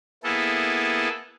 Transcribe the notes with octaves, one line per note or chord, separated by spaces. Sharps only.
A#3 B3 E4 G#4 A4